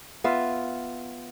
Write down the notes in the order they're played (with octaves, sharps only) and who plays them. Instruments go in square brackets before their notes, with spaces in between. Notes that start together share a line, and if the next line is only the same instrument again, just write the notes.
[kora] B3 F4 E5